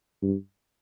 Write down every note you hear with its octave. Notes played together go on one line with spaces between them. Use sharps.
G2